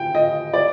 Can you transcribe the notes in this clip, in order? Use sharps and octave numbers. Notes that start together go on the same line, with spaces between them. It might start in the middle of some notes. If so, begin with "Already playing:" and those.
Already playing: G5
D#5
D5